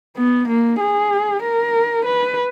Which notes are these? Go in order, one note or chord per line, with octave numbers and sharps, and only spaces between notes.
B3
A#3
G#4
A#4
B4